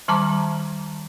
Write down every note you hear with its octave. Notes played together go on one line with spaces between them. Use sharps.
D#3 G3 A5 A#5 D6